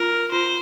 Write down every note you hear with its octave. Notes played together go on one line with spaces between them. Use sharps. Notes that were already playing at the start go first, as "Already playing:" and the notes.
Already playing: F4 A#4
F4 C5